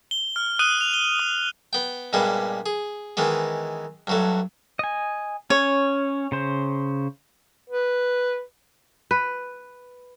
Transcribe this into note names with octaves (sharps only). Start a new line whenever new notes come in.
G7
F6
D#6 F#6 D#7
F7
G7
D#6
B3 G5
G2 A#2 G3 G#3 B3
G#4
D#3 E3 G#3 B3
G2 F#3 A3
D#5 G#5
C#4 C#5
C#3 C5
B4
B4